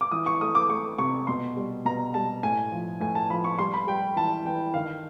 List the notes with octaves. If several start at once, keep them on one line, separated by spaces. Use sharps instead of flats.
D6
E3 D#6
C#6
A3 D#6
D6
A3 C#6
C3 C#6
B2 C6
G3
B2 A#5
G3 A5
A2 G#5
F3
A2 G#5
A5
F3 B5
C#6
G3 C6
B5
G3 G5
E3 A5
E3 G5
D#3 F5